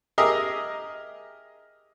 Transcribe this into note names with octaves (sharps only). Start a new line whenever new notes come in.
G4 G#4 A#4 D#5 E5 D#6